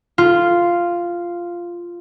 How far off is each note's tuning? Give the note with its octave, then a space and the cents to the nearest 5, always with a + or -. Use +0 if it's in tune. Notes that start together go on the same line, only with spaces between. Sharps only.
F4 -5